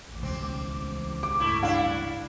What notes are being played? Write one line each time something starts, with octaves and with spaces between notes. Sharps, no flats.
A1 D#2 D6
C#2 B2 C4
D6
A1 G2 A3 E4
D4 E4 F5